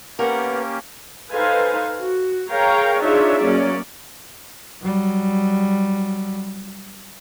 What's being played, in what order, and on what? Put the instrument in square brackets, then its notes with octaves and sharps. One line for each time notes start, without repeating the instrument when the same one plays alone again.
[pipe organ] A#3 C#4 G4 [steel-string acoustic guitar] B3 A#4 [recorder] F#5
[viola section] D#4 A4 B4 C5 F5 G#5
F#4
G#4 A#4 C#5 F5 G5 A#5
D4 D#4 F4 G#4 C#5 E5
F#3 A#3 C#4 D5
[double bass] F#3 G3